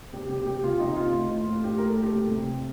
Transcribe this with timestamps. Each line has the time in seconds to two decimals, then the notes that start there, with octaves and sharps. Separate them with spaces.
0.13 C3 G4
0.29 C3 G4
0.46 C3 G4
0.64 C3 F4
0.80 C3 D#4
0.96 D#3 F4
1.13 A2
1.31 A2
1.48 A2
1.64 A2 G4
1.78 A3 A#4
1.89 A4
1.98 A2 G4
2.15 C3
2.31 C3